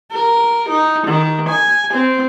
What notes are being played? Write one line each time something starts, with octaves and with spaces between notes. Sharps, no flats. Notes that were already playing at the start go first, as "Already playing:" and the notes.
A#4
D#4
D#3
G#5
C4